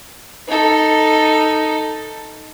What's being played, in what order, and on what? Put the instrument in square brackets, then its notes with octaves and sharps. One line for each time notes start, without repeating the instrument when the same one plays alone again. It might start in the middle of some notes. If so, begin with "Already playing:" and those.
[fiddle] D#4 A4